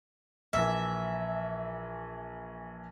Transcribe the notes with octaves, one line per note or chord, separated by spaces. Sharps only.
A#1 E3 E5